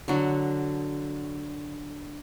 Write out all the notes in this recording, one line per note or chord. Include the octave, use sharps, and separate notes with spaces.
D3 F#3